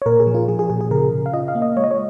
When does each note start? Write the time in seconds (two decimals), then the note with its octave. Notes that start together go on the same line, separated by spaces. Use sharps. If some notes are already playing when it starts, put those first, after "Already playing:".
0.02 C#5
0.06 A#2 A#4
0.20 G#4
0.27 F3
0.34 F4
0.48 F3 G#4
0.59 G#4
0.70 A#2 G#4
0.81 G#4
0.91 C#3 A#4
1.12 C#3
1.26 F5
1.34 F4 D#5
1.48 F5
1.55 A#3
1.62 D#5
1.77 G#3 C#5
1.84 D#5
1.91 C#5